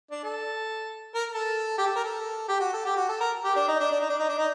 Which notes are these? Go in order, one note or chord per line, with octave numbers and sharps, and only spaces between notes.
D4
A4
A#4
A4
G4
A4
A#4
A4
G4
F#4
A4
G4
F#4
A4
A#4
G4
D4
D#4
D4
D4
D#4
D4
D#4
D4
D#4